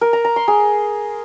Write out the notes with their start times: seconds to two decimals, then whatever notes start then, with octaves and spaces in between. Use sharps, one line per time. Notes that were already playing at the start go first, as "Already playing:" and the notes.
0.01 A#4
0.13 A#5
0.25 A#5
0.36 C6
0.48 G#4